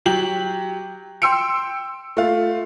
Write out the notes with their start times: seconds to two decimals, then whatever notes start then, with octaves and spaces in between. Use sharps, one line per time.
0.06 F#3 G4 F#7
1.22 G5 C6 E6 C#7 D7
2.17 A3 F4